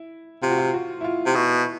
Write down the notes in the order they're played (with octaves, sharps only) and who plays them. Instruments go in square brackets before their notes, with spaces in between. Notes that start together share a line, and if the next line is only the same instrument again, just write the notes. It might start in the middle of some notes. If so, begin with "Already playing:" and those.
Already playing: [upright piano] E4
[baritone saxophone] C3 [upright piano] F4
[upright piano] F#4
F4
F#4
E4
F4
[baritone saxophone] C3
[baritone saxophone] B2 [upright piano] E4